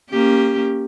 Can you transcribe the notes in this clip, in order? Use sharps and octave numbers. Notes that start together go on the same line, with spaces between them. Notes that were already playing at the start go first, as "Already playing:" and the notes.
A#3 C#4 G4